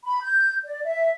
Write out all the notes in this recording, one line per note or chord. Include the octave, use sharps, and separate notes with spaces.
B5
G6
D5
E5